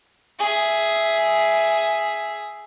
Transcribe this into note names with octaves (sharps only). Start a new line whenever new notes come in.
G#4 E5